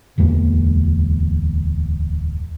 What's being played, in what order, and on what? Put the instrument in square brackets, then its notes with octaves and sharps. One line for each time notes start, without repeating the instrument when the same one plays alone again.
[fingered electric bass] D1 E2 G#3 A#3